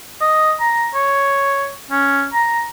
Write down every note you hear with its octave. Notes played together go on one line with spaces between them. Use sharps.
D#5
A#5
C#5
C#4
A#5